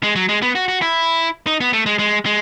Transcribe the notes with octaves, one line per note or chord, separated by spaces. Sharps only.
G#3
F#3
G#3
B3
F#4
F#4
E4
D#4
B3
A3
G#3
G#3
G#3